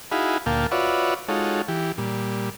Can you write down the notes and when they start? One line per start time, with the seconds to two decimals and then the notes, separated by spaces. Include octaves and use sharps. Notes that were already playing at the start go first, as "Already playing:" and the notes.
0.12 D#4 E4 F#4 G#4 F5 B5
0.46 D2 A#2 A#3 F5 G5 A5
0.71 F4 F#4 B4 C#5 D5 E5
1.28 G#3 D#4 F4 F#4 A4 C#5
1.68 E3 G4
1.98 A#2 G3